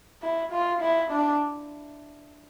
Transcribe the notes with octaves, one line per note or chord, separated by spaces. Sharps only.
E4
F4
E4
D4